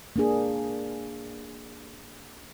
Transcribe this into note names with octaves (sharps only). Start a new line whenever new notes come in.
A#3 D4 G#4